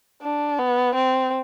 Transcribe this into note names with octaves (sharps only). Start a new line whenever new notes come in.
D4
B3
C4